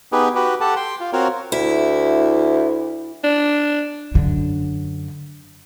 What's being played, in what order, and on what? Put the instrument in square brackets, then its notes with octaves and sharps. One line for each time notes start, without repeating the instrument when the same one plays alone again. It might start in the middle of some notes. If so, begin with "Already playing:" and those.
[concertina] B3 D#4 G4 G#4 B4
F#4 G4 B4
G4 A4 F#5 A5
G5 C6
F4
C4 F4 F#4 A#4 C#5
[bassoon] D2 [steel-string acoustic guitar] E4
[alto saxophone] D4
[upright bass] F#2 D3